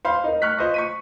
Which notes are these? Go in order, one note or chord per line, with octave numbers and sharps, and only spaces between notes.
C5 F5 B5 C6
D#4 A#4
C#6 F6 F#6 B6
F4 C5 D#5 C#6
C#6 B6 D#7